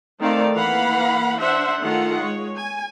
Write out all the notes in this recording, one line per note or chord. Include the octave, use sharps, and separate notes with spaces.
D#3 A3 C4 D5 F5
E3 A#3 F5 F#5 B5
D4 C5 E5 F#5
D#3 A3 F4 G#4 A4 F#5
G#3 C#5
G#5